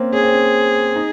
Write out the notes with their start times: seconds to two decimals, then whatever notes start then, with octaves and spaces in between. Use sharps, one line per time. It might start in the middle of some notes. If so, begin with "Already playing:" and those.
Already playing: A#3 C4 C#4
0.13 C#4 G#4
0.23 C4
0.33 C#4
0.96 D#4